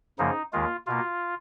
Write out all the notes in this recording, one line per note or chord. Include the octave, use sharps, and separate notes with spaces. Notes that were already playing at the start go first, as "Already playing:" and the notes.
F#2 C#3 F3 A#3 D#4
D#2 D#3 G#3 F4
B2 A#3 F4